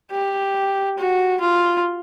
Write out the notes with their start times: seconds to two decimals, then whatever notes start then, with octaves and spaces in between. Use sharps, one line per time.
0.11 G4
0.98 F#4
1.41 F4